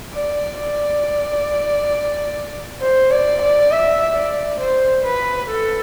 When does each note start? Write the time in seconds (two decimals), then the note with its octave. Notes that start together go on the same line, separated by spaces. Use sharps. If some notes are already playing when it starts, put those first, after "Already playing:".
0.14 D5
0.59 D5
2.81 C5
3.11 D5
3.42 D5
3.72 E5
4.16 D5
4.61 C5
5.05 B4
5.50 A4